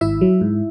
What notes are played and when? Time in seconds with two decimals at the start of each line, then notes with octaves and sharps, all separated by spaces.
0.01 G#1 E4 E5
0.21 F#3
0.41 G#2